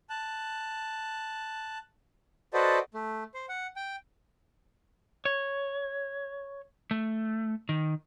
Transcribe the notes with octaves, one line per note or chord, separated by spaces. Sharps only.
A5 F#6
F#4 A4 B4 C5 D5 D#5
A3
C5
F#5
G5
C#5
A3
D#3